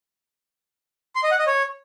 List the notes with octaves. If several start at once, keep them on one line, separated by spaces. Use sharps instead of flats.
C6
D#5
F#5
D#5
C#5